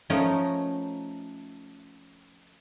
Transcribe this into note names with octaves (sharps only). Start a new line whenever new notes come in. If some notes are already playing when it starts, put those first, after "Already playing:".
F3 A3 C#4 D#4 A#4